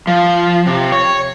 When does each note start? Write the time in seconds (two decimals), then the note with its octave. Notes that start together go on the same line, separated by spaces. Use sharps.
0.07 F3
0.67 C3
0.92 C#5